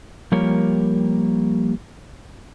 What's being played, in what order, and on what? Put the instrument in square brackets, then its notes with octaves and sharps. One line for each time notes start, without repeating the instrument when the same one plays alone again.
[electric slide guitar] F3 G3 A#3 G4 A#4 C#5